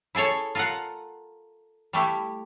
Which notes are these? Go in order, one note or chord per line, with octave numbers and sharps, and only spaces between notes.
E4 G#4 A4 C#5
F4 A4 A#4 F5 F#5
G3 A3 E4 G4